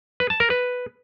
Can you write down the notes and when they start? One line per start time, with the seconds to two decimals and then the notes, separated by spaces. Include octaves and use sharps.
0.20 B4
0.30 A5
0.40 A#4
0.50 B4